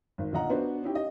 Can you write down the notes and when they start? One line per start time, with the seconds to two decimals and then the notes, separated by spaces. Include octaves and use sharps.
0.18 G#1
0.32 A#1 D3 F4 D#5 F#5 A#5
0.50 B3 D4 F#4 B4 C5
0.83 C#4 D#4 E4 G4
0.95 D#5